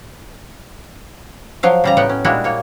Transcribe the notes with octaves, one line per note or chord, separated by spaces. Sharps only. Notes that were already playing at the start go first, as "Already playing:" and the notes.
F3 F#3 F5
C#3 G3 A#5
A2 F#3 B3 F#5 G5
C#4
A#2 G3 G#3 D4 E4 F#4
A#3 C#5